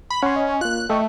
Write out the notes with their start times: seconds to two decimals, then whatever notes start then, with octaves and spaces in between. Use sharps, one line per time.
0.10 B5
0.23 C#4 F#5 G#5 C6
0.36 D#5
0.61 A#3 F4 F#6
0.90 A3 D#5 G5 C#6